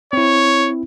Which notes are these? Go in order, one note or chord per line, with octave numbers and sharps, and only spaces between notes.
C4 E4 C#5